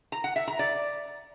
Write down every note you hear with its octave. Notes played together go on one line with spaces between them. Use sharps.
A#5
F#5
E5
A#5
D5